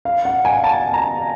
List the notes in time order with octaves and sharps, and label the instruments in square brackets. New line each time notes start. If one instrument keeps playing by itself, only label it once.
[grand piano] F5
F#5
G#5
A5
A#5